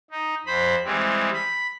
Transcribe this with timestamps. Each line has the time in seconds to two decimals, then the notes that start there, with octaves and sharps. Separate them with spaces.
0.11 D#4
0.46 F2 C5 B5
0.85 E3 G3 G#3 C4
1.33 B5